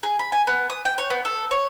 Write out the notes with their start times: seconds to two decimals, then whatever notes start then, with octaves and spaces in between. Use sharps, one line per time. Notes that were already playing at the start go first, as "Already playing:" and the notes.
0.03 G#4
0.19 B5
0.32 G#5
0.47 B3
0.70 D#6
0.85 G5
0.98 C#5
1.10 B3
1.25 A4
1.51 C#5